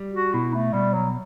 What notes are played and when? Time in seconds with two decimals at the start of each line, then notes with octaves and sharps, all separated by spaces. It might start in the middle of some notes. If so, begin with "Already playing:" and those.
Already playing: G3
0.14 F#4
0.33 B2 E4
0.54 A3
0.73 B2 G3
0.93 F#3